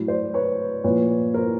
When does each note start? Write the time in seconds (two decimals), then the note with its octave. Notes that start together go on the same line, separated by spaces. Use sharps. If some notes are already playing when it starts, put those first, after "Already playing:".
Already playing: A2 F#3
0.08 C5 D5
0.34 B4 C#5
0.84 A#2 F3 B4 C#5
1.34 A#4 C5